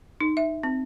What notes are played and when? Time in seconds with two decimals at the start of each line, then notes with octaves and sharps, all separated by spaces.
0.21 D#4
0.37 E5
0.63 C4